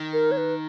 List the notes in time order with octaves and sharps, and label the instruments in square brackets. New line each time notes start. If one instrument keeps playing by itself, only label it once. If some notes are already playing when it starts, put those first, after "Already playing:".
Already playing: [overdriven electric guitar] D#3
[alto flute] A#4
C#5
B4